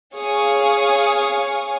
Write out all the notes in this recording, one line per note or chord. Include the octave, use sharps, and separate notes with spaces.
G#4 C#5 F5 C#6 D#6